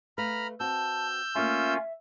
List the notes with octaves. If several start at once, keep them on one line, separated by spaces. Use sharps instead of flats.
A3 B4 F5 A#5 B5 F6
C4 F#4 A5 E6 G6
A3 A#3 C#4 F4 E5